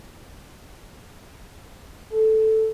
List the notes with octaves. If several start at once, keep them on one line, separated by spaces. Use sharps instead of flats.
A4